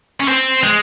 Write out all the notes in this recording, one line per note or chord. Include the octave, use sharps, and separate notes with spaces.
C#4
C4
G#3